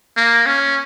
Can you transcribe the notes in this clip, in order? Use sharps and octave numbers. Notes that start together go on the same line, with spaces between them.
A#3
C#4